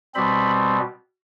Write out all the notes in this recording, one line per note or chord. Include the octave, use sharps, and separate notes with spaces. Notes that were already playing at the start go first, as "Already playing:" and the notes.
B2 G3 C4 B5